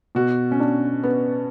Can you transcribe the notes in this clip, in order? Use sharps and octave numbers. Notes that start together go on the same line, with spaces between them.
B2 F#4
C#4
D4
B3